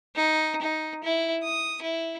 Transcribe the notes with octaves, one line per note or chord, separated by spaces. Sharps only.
D#4
D#4
E4
D#6
E4